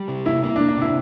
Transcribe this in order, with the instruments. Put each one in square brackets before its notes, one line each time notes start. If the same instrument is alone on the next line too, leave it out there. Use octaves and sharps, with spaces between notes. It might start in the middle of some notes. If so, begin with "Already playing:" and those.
Already playing: [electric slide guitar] G3
C3
[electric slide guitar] A#3 [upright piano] E4
[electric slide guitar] A#3 [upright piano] E4
[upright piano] D4
[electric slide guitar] A#3
[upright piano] D4
[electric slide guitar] C3 [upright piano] E4